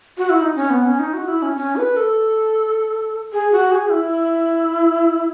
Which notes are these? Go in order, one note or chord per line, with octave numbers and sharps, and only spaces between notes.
F#4
E4
D#4
C#4
B3
C#4
D#4
F#4
E4
C#4
C#4
B4
A4
G#4
F#4
G#4
E4